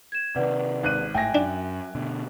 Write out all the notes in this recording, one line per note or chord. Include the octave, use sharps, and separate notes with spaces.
G#6 E7
C3 D#3 B4 D5 F#5
G#1 F#6 D#7
G#1 A2 E5 G5 G#5 A#6
F#2 D4
B2 D3